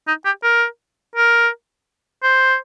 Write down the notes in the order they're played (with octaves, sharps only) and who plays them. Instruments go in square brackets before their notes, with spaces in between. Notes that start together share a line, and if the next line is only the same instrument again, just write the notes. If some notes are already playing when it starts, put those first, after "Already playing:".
[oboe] D#4
G4
A#4
A#4
C5